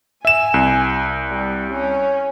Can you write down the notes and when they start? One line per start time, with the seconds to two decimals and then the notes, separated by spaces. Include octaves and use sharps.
0.25 E5 G#5 E7
0.54 C2
1.30 G3
1.72 C#4